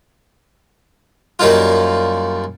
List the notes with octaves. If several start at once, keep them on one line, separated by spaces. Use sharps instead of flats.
F#2 G3 A#3 D#4 F4